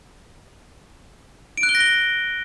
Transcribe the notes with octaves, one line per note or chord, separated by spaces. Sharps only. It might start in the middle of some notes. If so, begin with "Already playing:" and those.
D7
F#6
G7
A#6
G7